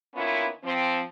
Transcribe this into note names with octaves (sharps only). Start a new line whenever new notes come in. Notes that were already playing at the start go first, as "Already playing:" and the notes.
D#3 A#3 B3 C#4 E4 F4
F3 C4